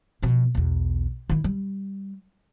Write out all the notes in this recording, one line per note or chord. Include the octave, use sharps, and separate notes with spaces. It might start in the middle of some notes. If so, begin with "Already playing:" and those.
B2 F3
B1 E2
D#3 E4
G3